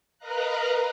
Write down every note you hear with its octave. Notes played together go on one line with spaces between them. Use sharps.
A#4 B4 D#5 F5 A#5 F#6